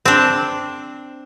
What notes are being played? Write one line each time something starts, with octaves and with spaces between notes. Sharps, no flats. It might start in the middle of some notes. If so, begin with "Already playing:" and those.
C4 D4